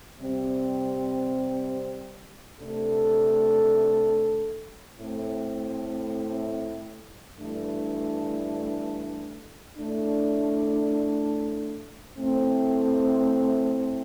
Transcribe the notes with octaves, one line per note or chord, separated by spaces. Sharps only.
C3 G3 C4 G4 C5
C3 A3 D4 A4
A2 A3 C4
G2 E3 A3 D4
A2 A3 D4
A2 A3 C4